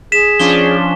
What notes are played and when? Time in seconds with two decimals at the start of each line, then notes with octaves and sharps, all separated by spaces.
0.12 G#4 B6 E7
0.40 F3 C#4 D4 G7